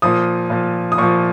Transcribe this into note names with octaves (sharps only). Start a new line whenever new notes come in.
A#2 F3 D#6
A#2 F3
D#6
A#2 F3 C#6